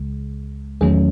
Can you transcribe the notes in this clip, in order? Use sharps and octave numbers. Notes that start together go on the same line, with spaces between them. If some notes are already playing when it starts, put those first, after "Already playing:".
Already playing: C#2 C#3 G#3
E2 D#3 F#3 A3 C#4 G#4